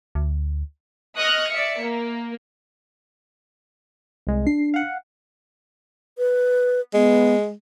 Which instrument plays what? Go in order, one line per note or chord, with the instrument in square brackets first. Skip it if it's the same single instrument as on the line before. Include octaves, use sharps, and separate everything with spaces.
[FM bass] D2
[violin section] D#5 C#6 D#6 F6 F#6
D5 E5 C#7
A#3
[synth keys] C2 G#3
[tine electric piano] D4 [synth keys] C7
[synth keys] F5 F#5
[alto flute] B4
[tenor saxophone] G#3 [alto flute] B3